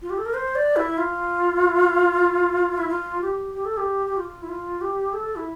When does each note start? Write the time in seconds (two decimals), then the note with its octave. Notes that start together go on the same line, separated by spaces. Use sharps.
0.02 F4
0.10 G4
0.18 A4
0.26 A#4
0.34 C5
0.55 D5
0.76 E4
0.98 F4
2.78 E4
2.89 F4
3.21 G4
3.53 G4
3.65 A4
3.77 G4
4.07 G4
4.17 F4
4.42 E4
4.49 F4
4.81 G4
5.13 A4
5.36 E4